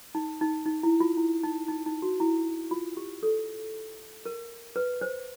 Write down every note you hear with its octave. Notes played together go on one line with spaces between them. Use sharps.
D#4
D#4
D#4
E4
F4
E4
D#4
D#4
D#4
F#4
E4
F4
G4
A4
A#4
B4
C5